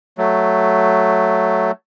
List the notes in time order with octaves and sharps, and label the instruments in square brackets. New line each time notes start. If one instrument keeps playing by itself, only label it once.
[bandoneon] F#3 A3